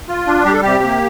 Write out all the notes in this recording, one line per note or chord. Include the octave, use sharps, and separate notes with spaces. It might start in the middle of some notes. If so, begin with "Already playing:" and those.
F4
D4
G3 G4
A4
C3 G4
A#3